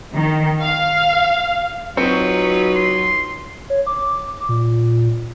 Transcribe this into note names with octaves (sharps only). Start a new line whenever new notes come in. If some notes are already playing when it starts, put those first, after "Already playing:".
D#3
F5
F#3 C4 D#4 F4 B4 C#6
C6
C#5
D6
A#2